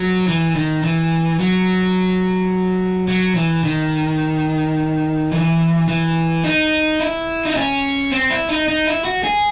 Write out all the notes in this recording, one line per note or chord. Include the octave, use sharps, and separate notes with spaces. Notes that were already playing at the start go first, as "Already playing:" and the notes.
Already playing: F#3
E3
D#3
E3
F#3
F#3
E3
D#3
E3
E3
D#4
E4
D#4
C#4
C4
E4
D#4
D#4
E4
F#4
G#4